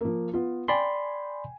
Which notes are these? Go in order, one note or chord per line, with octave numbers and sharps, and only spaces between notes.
F3 A#3
B3 F4
D5 G5 G#5 B5 C6